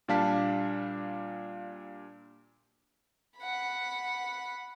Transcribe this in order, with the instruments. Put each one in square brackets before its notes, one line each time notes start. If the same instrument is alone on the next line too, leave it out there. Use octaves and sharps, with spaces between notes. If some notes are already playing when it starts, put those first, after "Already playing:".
[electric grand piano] A#2 G3 D4 F5 A5 B6
[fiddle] F#5 B5